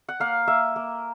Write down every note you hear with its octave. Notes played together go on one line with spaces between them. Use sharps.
F#5
A#3 F5
A#3 E5
A#3